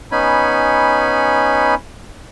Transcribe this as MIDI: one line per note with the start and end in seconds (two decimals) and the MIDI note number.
0.12 1.75 59
0.12 1.75 61
0.12 1.75 63
0.12 1.75 80
0.12 1.75 83